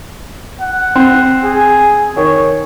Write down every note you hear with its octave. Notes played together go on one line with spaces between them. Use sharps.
F#5
C4
G#4
D#3 C#5